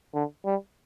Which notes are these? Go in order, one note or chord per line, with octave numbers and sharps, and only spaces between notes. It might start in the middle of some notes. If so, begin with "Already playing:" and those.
D3
G3